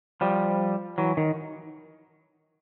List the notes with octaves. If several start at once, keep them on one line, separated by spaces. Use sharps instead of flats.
F3 G3
E3 F#3
D#3